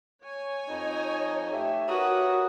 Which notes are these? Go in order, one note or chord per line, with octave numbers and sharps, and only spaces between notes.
C#5 G#5
F2 D#4
A3 G4 E5
F#4 G4 A#4 B4 C#5 A#5 D#6